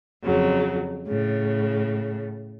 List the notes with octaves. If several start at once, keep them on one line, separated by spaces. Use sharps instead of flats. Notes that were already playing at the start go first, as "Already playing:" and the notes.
F2 C#3 F#3
A2 C#3